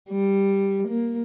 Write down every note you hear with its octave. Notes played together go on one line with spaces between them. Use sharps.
G3
A#3